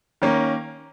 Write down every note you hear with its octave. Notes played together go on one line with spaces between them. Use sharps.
D#3 A#3 C#4